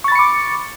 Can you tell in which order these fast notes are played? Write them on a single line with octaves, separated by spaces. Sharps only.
C#6 A6 B5 C#7 D6